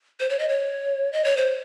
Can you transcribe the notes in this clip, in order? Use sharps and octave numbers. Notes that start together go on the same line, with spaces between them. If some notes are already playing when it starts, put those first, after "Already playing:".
C5
C#5
D#5
C#5
D#5
C#5
C5